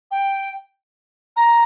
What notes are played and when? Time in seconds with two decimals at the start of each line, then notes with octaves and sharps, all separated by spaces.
0.11 G5
1.37 A#5